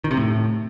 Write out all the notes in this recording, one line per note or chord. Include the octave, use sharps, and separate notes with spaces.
D#3
C3
A2